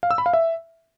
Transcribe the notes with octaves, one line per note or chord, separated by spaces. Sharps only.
F5
E6
B5
F5
E5